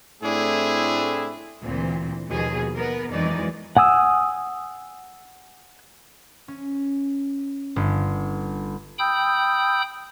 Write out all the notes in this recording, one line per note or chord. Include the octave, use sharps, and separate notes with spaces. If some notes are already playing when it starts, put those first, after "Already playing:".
A2 A3 C4 D4 E4 G#4
D2 A#2 E3 C4
D#2 B2 F3 G#3 G#4
B3 A#4 B4
F2 E3 F#3 G#3 D#4 D5
F#5 G#5 D#6 E6
C#4
G1
G5 B5 D#6 E6 G6